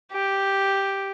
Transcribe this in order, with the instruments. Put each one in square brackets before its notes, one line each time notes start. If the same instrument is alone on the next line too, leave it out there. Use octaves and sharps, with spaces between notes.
[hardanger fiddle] G4